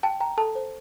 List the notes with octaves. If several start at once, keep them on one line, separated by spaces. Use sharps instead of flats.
G5 A5
G5 A#5
A4 A5
C5